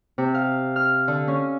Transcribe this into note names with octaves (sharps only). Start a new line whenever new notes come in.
C3
F5
F6
D3
C#4